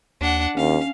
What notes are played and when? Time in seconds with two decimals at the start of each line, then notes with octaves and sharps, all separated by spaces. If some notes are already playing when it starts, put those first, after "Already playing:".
0.21 D#2 D4 F#5
0.57 D#2 C#4 F5